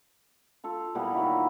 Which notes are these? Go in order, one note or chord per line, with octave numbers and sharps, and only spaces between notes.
F4 A4 F5
A#2 E3 G3 B3
D#3 F#3 E4